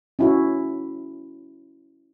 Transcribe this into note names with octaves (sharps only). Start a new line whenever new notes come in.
C#4 E4 F#4